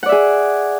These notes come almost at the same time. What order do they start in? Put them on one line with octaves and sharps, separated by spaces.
F#5 D5 E5 G#4